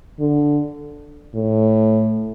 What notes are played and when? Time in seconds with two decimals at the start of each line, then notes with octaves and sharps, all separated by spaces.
0.19 D3
1.35 A2